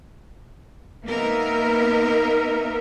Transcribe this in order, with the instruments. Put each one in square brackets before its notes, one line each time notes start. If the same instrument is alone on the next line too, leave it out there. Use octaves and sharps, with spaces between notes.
[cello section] A#3 B3 D#4 A#4 E5